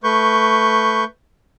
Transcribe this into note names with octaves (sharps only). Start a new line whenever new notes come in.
A3 B4 C#6 G6